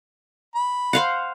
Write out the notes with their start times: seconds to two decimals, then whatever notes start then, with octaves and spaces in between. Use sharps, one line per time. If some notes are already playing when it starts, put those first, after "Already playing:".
0.55 B5
0.93 C5 F5 F#5